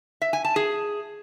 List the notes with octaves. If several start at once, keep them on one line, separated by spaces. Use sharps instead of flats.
E5
G#5
A5
G#4